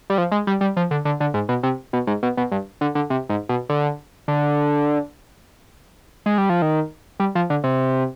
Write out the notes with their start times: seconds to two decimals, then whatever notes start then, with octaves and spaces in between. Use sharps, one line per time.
0.10 G3
0.18 F3
0.32 G#3
0.47 G3
0.61 G3
0.77 F3
0.91 D3
1.05 D3
1.20 D3
1.34 G#2
1.49 B2
1.63 C3
1.93 B2
2.07 G#2
2.23 B2
2.37 B2
2.52 G2
2.81 D3
2.95 D3
3.10 C3
3.29 G#2
3.49 B2
3.69 D3
4.28 D3
6.26 G#3
6.38 G3
6.50 F3
6.62 D#3
7.20 G3
7.35 F3
7.50 D3
7.64 C3